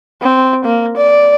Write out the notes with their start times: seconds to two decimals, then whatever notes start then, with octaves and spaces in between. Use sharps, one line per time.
0.22 C4
0.65 A#3
0.97 D5